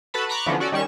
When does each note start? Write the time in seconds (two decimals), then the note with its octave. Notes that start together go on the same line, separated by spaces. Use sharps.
0.14 F#4 A4 B4 A5 B5
0.29 A#5 B5 C#6 D6 F#6
0.46 D3 E3 F3 B3 C#4 D4
0.60 C#4 F#4 A4 D5
0.72 D#3 G3 C#4 C#6 E7